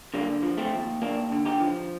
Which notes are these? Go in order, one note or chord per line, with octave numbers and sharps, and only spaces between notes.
D3 G3 A#3
F3
A3 C4
D#2
D#2 A#3 D4
D3
D#4 G4
F3